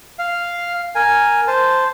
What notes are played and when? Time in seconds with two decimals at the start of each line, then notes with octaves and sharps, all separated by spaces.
0.19 F5
0.95 A#4 G#5
1.48 C5 A5